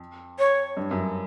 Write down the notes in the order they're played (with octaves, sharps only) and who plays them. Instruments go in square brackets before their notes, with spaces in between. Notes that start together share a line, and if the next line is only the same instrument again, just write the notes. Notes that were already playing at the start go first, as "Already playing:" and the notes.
Already playing: [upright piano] F2
[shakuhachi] C#5
[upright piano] G2
F#2